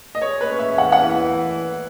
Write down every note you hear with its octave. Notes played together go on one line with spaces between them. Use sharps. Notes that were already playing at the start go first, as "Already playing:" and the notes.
D#5
G#3 C#5
B4
C#4
E5
E2
F#5
F#5
E3